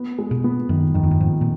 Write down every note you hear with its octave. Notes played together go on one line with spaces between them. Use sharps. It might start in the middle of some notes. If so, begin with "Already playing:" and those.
Already playing: B3
G#3
B2
B3
F#2 D#3
F#2 D#3
F2
F#2
F2 G#2
A#2